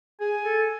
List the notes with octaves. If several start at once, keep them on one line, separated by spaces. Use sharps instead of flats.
G#4 G#5
A4